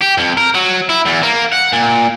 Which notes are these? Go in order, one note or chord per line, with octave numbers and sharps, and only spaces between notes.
G4
F2
A#4
F#3
E4
E2
A#3
F#5
A#2